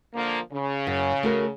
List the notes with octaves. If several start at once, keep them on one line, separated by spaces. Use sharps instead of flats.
D3 F3 A#3
C#3
F#2
A3 F#4 A#4